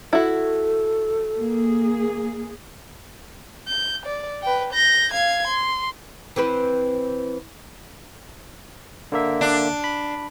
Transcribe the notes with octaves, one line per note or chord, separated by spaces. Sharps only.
E4 F#4 A4
A#3 G#4
G6
D5
B4 G5
G6 A#6
F5 G#6
C6
E3 C4 B4
D3 A#3 E5
D4
B5